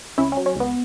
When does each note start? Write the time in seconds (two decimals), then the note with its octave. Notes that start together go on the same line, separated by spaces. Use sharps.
0.18 C#2 C#4 E4
0.32 F#3 C#4
0.46 C#4
0.56 C#2 B3